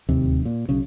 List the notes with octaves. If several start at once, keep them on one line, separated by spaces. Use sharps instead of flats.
D1 D#2 C3
A#2
B1 C#3